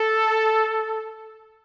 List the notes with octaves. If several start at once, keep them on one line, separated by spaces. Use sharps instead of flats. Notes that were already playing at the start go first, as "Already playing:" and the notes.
Already playing: A4